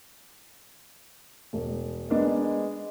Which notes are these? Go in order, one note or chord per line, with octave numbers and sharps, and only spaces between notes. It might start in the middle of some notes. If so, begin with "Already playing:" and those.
E1
G#3 B3 D4 A#4